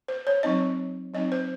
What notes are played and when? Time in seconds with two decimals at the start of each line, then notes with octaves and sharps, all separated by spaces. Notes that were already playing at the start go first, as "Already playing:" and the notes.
0.08 C5
0.27 C#5
0.43 F#3 C4 D#4 D#5
1.14 F#3 C4 D#4 D#5
1.32 C5